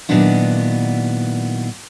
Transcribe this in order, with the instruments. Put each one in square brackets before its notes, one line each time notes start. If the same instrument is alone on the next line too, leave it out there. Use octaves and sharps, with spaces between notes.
[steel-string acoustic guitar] A#2 D#3 F#3 B3 D4 E4